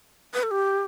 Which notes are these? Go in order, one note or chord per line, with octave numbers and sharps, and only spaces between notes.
B4
A4
G4